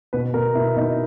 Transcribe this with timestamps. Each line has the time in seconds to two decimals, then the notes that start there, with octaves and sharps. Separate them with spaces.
0.13 B2 B4
0.34 B2 A#4
0.55 B2 E4
0.77 B2 D#4